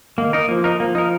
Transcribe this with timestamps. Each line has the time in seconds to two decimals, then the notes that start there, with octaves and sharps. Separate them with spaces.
0.18 D#3 A#3
0.33 D#4 A#4
0.48 F3 A#3
0.64 D#4 A#4
0.80 F3 A#3
0.95 D#4 A#4